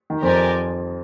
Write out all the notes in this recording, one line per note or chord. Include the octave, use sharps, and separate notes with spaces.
D#3
F2 F3 G4 A#4 D5 G#5